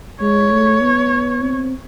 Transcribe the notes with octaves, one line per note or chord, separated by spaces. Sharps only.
G#3 C#5
A3
B3
C4